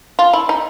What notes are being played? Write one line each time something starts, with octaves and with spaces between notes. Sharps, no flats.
F4
E4
D#4